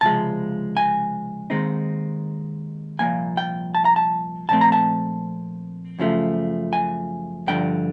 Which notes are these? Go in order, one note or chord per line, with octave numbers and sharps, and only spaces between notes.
C#2 C3 F3 G#3 A5
G#5
D#2 D#3 G#3 C4 D#4
C2 A#2 F3 A#3 G#5
G5
A5
A#5
A5
A#2 F3 A3 C4 A5
A#5
A5
F#2 C#3 F3 A3
G#5
G2 D3 F3 G5